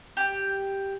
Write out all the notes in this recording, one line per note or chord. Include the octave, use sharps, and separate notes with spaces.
G4